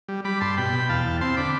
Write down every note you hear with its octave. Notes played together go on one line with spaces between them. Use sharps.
G3
G3 B5 D6
G2 A5 C6
B2 G5 B5
B2
G5
E2 F5 A5
E2
C4 A5 C6
D3 B5 D6